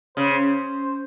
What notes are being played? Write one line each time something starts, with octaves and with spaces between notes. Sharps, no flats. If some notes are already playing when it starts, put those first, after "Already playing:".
C#3 C5